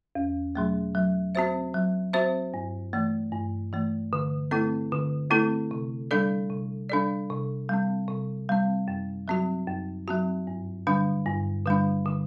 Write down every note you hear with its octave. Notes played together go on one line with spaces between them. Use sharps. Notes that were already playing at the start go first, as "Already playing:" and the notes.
E2
B2 F#3 A3
F#3
C4 F#4 C5 E5
F#3
C4 F#4 C5 E5
G2
E3 A3
G2
E3 A3
D3
A3 C4 E4 A4
D3
A3 C4 E4 A4
C3
G3 D4 A4 D5
C3
G3 D4 A4 D5
C3
G3 C4
C3
G3 C4
F#2
F#3 C4 F#4
F#2
F#3 C4 F#4
G2
D3 G3 D4
G2
D3 G3 D4
D3